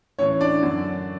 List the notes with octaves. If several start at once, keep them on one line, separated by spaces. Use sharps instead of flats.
A2 E3 C#4 C#5
D4 D5
F#2 D3